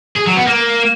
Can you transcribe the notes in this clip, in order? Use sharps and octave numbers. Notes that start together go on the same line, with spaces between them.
G#4
F#3
B3
A#3